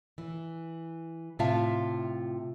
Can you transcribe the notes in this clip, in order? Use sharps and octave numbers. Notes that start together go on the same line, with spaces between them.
E3
A2 C3 F4 E5 F5 A5